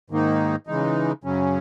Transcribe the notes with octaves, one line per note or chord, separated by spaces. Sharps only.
G#2 D#3 A#3 D#4
C#3 E3 G#3 D#4
F#2 C#3 F#3 C#4